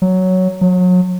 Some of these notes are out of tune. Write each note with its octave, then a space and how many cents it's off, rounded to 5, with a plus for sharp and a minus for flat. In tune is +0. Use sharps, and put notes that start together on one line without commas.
F#3 +5
F#3 -30